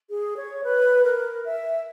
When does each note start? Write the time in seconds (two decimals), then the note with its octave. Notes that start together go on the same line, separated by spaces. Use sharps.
0.10 G#4
0.37 C#5
0.64 B4
1.04 A#4
1.45 E5